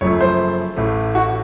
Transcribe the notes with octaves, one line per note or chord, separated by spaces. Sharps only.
F#1 F#2 F3 A3 C#5
C5
A1 A2 A3
F#4